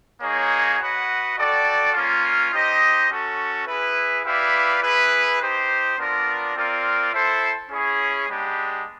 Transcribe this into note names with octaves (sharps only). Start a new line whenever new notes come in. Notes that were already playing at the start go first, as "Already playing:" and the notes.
A#3 D#4 G#4 C#5
F#4 B4 D#5 F#5
F#4 A4 D5 G5
A#3 C#4 F4
D#4 G4 C5 D#5
C#4 F#4 A4
E4 G#4 B4
E4 G4 B4 D5 F5
E4 G#4 B4
D#4 G4 C5
B3 D4 F4 A#4 D5
C4 F4 A#4 D5
E4 A4 C5
C#4 E4 G#4 C#5
G#3 B3 D4 G4